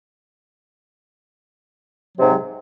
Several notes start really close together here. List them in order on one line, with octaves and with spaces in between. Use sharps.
F#3 C3 G#2